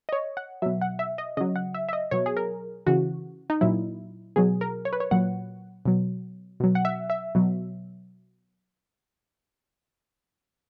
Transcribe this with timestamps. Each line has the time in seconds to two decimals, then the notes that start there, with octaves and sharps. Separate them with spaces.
0.09 D#5
0.13 C#5
0.37 F#5
0.62 B2 F#3 E5
0.81 F#5
0.99 E5
1.18 D#5
1.37 C#3 F#3 D#5
1.56 F#5
1.74 E5
1.89 E5
1.93 D#5
2.11 B2 F#3 C#5
2.26 G#4
2.37 A#4
2.86 C#3 E3 F#4
3.50 D#4
3.61 A#2 F#3 E4
4.36 B2 F#3 G#4
4.61 A#4
4.85 C#5
4.93 B4
5.00 C#5
5.11 A#2 F#3 F#5
5.86 B2 F#3
6.60 B2 F#3
6.75 F#5
6.85 E5
7.10 E5
7.35 B2 F#3